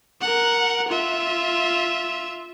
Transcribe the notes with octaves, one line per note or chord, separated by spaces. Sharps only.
A#4 F#5
F4 E5